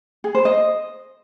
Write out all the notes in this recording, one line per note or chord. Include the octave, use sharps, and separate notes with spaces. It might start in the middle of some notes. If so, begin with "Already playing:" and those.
G#4
C5
D#5